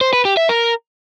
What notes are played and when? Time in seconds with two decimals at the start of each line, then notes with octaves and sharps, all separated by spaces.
0.01 C5
0.13 B4
0.25 G4
0.37 E5
0.49 A#4